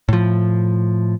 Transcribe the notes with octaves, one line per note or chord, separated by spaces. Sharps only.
A2 F3